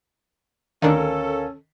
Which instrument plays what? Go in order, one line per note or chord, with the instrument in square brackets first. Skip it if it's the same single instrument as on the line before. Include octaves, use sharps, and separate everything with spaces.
[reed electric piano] D2 A#4 F5 [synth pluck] D#3 D4 [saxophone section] C#4 A4